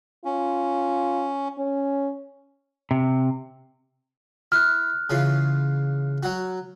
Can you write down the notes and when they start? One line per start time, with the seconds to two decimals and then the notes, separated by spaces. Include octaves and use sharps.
0.25 C#4 F4
1.58 C#4
2.91 C3
4.52 E4 F6 F#6
5.10 C#3 E3 F4
6.23 F#3 F#4